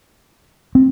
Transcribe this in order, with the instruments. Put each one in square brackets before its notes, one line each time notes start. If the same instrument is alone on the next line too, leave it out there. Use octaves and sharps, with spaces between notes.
[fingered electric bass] C4